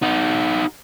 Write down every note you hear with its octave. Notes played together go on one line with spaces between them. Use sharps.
D#4 F#4